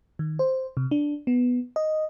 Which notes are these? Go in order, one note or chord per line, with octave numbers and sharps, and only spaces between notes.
D#3
C5
C3
D4
B3
D#5